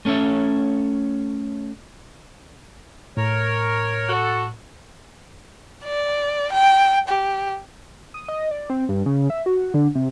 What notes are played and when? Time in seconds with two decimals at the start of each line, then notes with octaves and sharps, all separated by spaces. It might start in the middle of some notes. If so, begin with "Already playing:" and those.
0.05 A3 C#4 A4 C#5 E5
3.17 A2 A#4 C#5
4.09 F#4 A4
5.84 D5
6.52 G5
7.08 G4
8.14 D#6
8.28 D#5
8.51 D5
8.70 C4
8.89 G2
9.06 C#3
9.30 E5
9.46 F#4
9.74 D3
9.95 C3